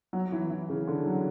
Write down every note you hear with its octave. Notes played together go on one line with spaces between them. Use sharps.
F#3
E3
E3
C#3
D3
F#3